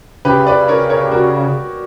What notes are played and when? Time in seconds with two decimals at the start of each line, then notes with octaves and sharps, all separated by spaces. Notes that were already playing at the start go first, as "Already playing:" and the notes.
0.25 C#3 G4 B4
0.47 B4 D5
0.68 A#4 C#5
0.89 A#4 C#5
1.04 G4
1.12 F#4 A#4